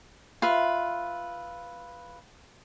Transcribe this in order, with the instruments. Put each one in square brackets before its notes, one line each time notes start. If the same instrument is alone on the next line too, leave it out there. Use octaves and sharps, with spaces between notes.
[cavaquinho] F4 B4 E5